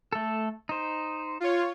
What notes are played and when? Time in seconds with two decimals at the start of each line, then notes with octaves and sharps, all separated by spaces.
0.13 A3 A4
0.69 D#4 C5
1.40 F4 C#5